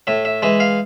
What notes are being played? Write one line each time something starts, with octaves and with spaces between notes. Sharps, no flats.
A2 E5
E5
E3 G#3 E5
F5